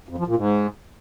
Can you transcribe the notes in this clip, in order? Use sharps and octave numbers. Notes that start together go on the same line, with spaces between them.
F2
F3
A#2
G#2